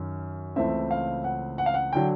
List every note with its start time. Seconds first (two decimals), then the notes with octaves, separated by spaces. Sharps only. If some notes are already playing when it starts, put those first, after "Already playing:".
Already playing: F#2 D#3
0.56 C#2 C#3 E3 A3 C4 E5
0.91 F5
1.24 F#5
1.58 F#5
1.66 F5
1.74 F#5
1.93 D3 F#3 G5